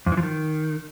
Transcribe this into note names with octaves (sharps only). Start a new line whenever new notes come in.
F2
E3
F3
D#3